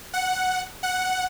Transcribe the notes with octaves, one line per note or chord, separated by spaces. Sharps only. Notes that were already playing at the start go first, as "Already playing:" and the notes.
F#5
F#5